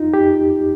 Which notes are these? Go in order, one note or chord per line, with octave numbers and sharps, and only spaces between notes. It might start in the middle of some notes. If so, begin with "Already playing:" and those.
Already playing: D#4 F4
G4